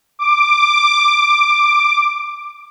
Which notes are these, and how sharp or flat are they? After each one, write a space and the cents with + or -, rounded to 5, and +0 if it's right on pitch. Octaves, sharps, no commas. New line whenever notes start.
D6 +10